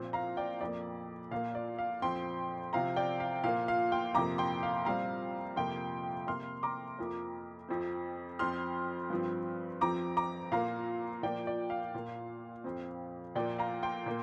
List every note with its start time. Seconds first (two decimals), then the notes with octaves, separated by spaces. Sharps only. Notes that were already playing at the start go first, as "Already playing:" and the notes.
Already playing: A#2 F3 C4
0.13 F5 A#5
0.37 D5 G5
0.61 F2 F3 A#3 D5
1.31 A#2 A#3 F5
1.55 D5
1.78 F5
2.02 F2 F3 C4 G5 C6
2.73 C3 F3 C4 F5 A#5
2.96 D5 G5
3.20 F5
3.44 A#2 F3 A#3 F5
3.68 F5
3.92 G5 C6
4.14 F2 C3 F3 A#3 A#5 D6
4.38 G5 C6
4.63 F5
4.85 A#2 G3 C4 F5 A#5
5.56 F2 C3 F3 A#3 G5 C6
6.27 C3 A#3 C6 F6
6.63 A#5 D6
6.99 F2 F3 A#3
7.68 F2 F3 C4
8.39 F2 F3 C4 C6 F6
9.10 G2 F3 C4
9.81 F2 F3 C4 A#5 D6
10.17 A#5 D6
10.52 A#2 A#3 F5 A#5
11.23 A#2 F3 A#3 D5 G5
11.47 D5
11.70 F5
11.95 A#2 A#3
12.64 F2 F3 C4
13.35 A#2 F3 A#3 D5 G5
13.59 F5 A#5
13.83 G5 C6
14.06 A#2 A#3